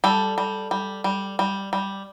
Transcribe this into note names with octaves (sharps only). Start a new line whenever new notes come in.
G3 A4
G3
G3
G3
G3
G3